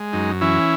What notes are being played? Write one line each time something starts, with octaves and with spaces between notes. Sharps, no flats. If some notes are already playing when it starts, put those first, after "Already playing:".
Already playing: G#3
F#2 D#4
E3 C#4 E4